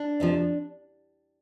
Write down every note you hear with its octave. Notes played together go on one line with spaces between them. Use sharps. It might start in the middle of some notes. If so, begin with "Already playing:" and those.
Already playing: D4
F2 C3 F3